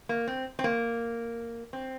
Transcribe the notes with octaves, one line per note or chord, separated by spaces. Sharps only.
A#3
C4
C4
A#3
C4